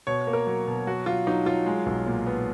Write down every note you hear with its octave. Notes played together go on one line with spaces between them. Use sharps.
B2 C#5
A#3
A#4
F#3
B2
F#3 F#4
F#3 F4
F#3 D#4
F#3 F4
G#3
B1
A#2
B3